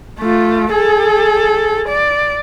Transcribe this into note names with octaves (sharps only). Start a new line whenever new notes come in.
A3 F4
G#4 A4
D5